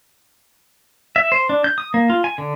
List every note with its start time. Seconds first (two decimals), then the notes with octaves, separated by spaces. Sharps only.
1.16 E5
1.32 C5
1.49 D4
1.64 G6
1.78 D#6
1.94 A#3
2.10 F4
2.24 G#5
2.38 D3